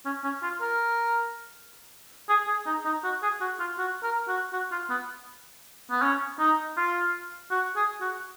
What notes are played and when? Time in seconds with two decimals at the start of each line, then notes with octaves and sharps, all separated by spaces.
0.06 C#4
0.24 C#4
0.43 F4
0.61 A#4
2.29 G#4
2.48 G#4
2.66 D#4
2.85 D#4
3.04 F#4
3.23 G#4
3.41 F#4
3.60 F4
3.78 F#4
4.03 A#4
4.28 F#4
4.53 F#4
4.72 F4
4.90 B3
5.91 B3
6.02 C#4
6.39 D#4
6.77 F4
7.51 F#4
7.76 G#4
8.01 F#4